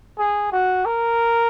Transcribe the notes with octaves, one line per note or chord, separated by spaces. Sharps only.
G#4
F#4
A#4